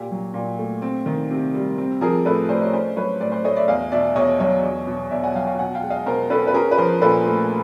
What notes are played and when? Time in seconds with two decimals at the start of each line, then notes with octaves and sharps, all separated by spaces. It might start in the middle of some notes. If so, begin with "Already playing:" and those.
Already playing: A#2 G4
0.11 F#3
0.34 A#2
0.59 A3
0.82 C4
1.06 D#3
1.30 C3
1.54 G3
1.78 C4
2.01 F3 G#4 A#4
2.25 A2 A4 B4
2.49 A3 C5 D5
2.61 C#5 D#5
2.72 C#4 C5 D5
2.96 F#3 B4 C#5
3.20 A2 C5 D5
3.32 C5 D5
3.44 A3 C#5 D#5
3.56 D5 E5
3.68 E2 D#5 F5
3.92 B2 D5 E5
4.16 E2 C#5 D#5
4.40 F#3 C#5 D#5
4.63 E2
4.87 B2
5.11 E2 D5 E5
5.23 F#5 G#5
5.35 F#3 F5 G5
5.47 F5 G5
5.59 B2 F#5 G#5
5.75 F5 G5
5.83 G#3
5.90 D#5 F5
6.06 B2 A#4 C5
6.30 C#4 A4 B4
6.47 B4
6.54 C#4 G#4 A#4
6.71 B4
6.78 F3 A#4 C5
7.02 A#2 A4 B4
7.26 A3